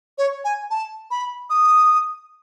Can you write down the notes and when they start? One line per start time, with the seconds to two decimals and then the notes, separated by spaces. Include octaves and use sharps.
0.18 C#5
0.44 G#5
0.70 A5
1.11 B5
1.50 D#6